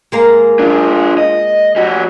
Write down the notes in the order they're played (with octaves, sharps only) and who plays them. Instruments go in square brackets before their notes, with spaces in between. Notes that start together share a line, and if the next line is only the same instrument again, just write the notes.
[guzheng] G#3 A#3 A#5
[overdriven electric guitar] D4 F4
D#5
G3 F#4